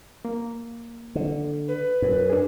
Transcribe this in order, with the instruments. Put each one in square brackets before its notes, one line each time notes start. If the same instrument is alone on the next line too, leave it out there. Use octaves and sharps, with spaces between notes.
[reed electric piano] A#3
[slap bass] D3
[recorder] B4
[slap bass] F#2
[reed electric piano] D4 G#4